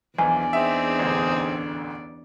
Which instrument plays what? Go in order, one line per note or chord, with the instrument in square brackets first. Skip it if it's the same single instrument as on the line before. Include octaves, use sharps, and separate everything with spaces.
[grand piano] B1 E3 F3 [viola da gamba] E2 D4 D5 [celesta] G#5
[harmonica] C4 D#4 G#4 [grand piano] E5 G5
[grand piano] A1 D2 D3